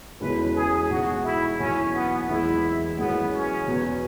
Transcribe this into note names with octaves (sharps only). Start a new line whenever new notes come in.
E1 E2 C#3 G#3 E4 B4
G#4
B1 B2 G#3 F#4
E4
F#1 E2 B2 F#3 C#4 E4
B3
E1 E2 E3 G#3 E4
F#2 E3 G#3 B3
C#4
E2 B2 B3 F#4